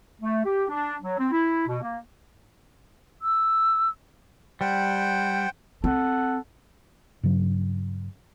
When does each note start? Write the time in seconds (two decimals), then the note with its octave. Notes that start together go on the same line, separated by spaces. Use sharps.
0.21 A3
0.45 G4
0.69 D4
1.02 F#3
1.18 C4
1.32 E4
1.66 B2
1.82 A#3
3.22 E6
4.61 G3 C5 F#5 G5
5.84 C4 A4 F#5
7.23 G2 C#3 F#3